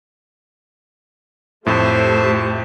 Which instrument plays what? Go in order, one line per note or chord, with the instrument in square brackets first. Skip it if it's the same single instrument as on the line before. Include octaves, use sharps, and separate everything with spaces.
[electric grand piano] F2 A2 [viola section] A3 F4 G4 [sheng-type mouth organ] C5 E5 A5